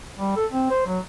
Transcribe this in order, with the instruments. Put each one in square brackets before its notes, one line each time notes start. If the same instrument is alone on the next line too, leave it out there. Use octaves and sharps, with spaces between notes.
[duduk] G3
A4
C4
C5
F#3